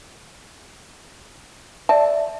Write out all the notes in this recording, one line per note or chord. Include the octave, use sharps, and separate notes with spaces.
D5 E5 A5